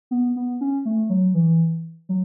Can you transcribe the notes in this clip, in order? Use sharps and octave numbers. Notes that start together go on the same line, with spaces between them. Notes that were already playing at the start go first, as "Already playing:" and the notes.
B3
B3
C#4
A3
F#3
E3
F#3